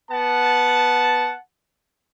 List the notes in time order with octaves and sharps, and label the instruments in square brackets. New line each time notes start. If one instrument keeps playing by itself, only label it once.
[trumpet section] B3 F#5 A5